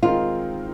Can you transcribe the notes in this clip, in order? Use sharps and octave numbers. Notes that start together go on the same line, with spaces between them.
D#3 G#3 C4 D#4 F4 A#4